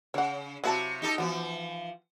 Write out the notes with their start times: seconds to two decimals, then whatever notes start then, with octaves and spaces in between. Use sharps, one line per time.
0.14 C#3 C#5 F#5
0.64 C3 F#3 E4 F#4 A5
1.02 D#4 G4 A4
1.18 E3 F3 B3 F#4